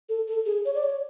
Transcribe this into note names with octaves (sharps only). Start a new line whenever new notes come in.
A4
A4
G#4
C#5
D5
C#5